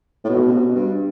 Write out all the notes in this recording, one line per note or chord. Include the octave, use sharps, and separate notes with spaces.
A2
B2
C3
B2
G2